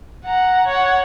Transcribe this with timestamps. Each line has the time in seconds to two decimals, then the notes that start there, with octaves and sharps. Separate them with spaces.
0.25 F#5 A#5
0.66 C#5 F#5